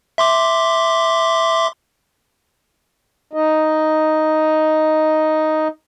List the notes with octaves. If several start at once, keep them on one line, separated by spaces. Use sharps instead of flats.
E5 C6 D6
D#4 D#5